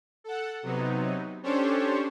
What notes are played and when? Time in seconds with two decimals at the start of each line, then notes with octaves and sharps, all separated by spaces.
0.24 A4 F#5
0.63 C3 F#3 B3 D#4
1.43 C#4 D4 G4 A4 C5 C#5